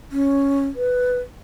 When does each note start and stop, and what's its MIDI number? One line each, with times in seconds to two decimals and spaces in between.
0.12 0.65 61
0.76 1.18 71